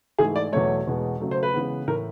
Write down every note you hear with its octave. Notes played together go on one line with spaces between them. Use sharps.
G#2 E3 A3 G#4
D5
E2 B2 F#3 A3 C#5
E2 B2 G#3
C#3 F#3 A3
C5
B4
C#3 E3 G#3 B3
A2 E3 A3 A#4